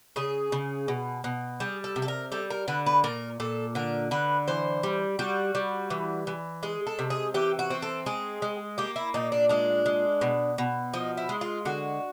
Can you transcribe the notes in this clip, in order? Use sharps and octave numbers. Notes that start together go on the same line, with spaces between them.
C#3 G#4
C#3
B2
B2
G3 G#4
A4
C3
A4
A#4
G3 A4
A#4
D3 B4
B4
A#2 A#4
A#2 A4
D3 A#4
D3 B4
E3 C5
G3
G3 F#4
G3
E3
E3
G#3 G#4
A4
C3
G#4
E3 G4
F#4
C4
A4
G#3 G#4
G#3
A#3 G4
E4
A#2 D#4
D4
G#3 D4
G#3
B2
B2
F3 D#4
E4
G#3
F4
D3 F#4